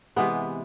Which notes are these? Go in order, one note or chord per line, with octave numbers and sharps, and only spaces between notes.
C3 E3 G#3 B3